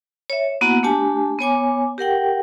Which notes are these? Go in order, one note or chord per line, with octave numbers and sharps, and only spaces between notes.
C#5 E5
A#3 B3 E4 F#4 F#5
A3 D4 G4 G#5 A5
B3 C#5 G#5 D6
G4 A#4 F#5 G5